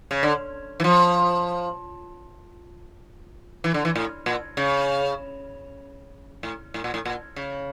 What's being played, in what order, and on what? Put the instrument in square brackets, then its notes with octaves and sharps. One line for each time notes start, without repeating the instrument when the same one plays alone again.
[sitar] C#3
D3
E3
F3
E3
D3
E3
A2
A#2
C#3
A2
A2
A#2
A2
A#2
C#3